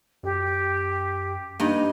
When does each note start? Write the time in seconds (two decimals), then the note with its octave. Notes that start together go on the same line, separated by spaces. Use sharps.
0.23 F#2 G4
1.60 G2 A#3 D#4 D#5